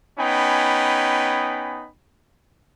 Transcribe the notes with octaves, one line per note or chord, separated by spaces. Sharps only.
B3 C#4 D#4 G5 G#5 B5